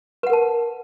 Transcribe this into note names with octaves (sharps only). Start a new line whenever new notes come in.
A#4 B4 F#5 A5